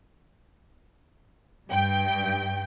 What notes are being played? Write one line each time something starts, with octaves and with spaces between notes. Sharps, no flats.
G2 G5